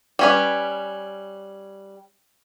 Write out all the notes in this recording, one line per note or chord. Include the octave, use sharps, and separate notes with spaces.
G3 C#4 B4